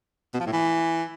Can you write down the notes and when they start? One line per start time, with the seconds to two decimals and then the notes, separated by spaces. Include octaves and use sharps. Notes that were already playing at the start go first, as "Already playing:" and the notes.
0.34 B2
0.40 F3
0.46 A2
0.52 E3